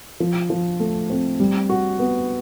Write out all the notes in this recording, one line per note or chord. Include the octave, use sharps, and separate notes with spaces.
F3
F3
A3
C4
G3
F#4
B3